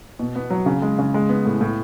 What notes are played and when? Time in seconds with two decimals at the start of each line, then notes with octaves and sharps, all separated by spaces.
0.19 B2
0.36 B3
0.50 F#3
0.66 C#3
0.82 G#3
0.99 C#3
1.14 G#3
1.29 B3
1.46 A2
1.61 A2